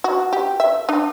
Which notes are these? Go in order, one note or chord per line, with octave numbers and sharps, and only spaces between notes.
F#4
G4
E5
D4